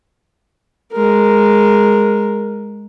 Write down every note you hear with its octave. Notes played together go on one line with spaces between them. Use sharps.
G#3 A#4